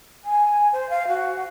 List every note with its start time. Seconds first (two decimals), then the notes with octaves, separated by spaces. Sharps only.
0.25 G#5
0.72 C5
0.90 F5
1.08 F#4